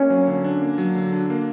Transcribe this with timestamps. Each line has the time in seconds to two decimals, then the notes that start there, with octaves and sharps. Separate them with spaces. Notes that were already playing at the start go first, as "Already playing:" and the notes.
Already playing: A#3 C#4
0.10 F#3
0.27 D3
0.44 D4
0.62 A#3
0.78 F#3
0.95 D3
1.13 D4
1.30 A#3